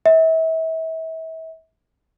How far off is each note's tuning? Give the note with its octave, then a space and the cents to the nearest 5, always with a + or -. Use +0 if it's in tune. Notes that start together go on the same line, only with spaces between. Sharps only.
E5 -35